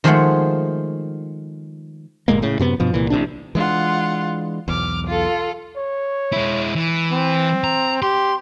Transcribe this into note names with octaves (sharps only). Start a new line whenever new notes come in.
D#3 F3 G#3 A3 C5 F#5
G1 A#2 G#3 A#3
A2 C#3
F#2 C3 B3
G2 B2 F3
C2 A#2 E3
A1 C3 D4
E3 G#3 D4 F4 F#5
B1 E2 D6 F6
F4 A4
C#5
G#3 E4
E3
C4
A#5
G4 C6